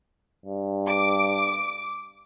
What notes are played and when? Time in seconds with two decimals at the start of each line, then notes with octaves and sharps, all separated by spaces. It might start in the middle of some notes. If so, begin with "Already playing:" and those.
0.46 G2
0.87 D6